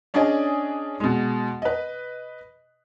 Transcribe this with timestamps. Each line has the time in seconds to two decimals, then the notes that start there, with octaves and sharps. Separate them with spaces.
0.14 C#4 D4 G#4 D5 D#5 G#5
1.00 B2 G#3
1.62 B4 D#5